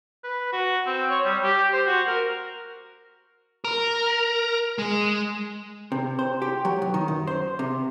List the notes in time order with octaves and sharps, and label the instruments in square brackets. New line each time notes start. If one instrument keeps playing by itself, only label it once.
[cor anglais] B4
F#4
C4
C#5
G3
G4
C5
F#4
A#4
[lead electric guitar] A#4
G#3
[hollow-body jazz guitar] C3
C5
G4
F#3
B1
D#3
F#2
C5
C3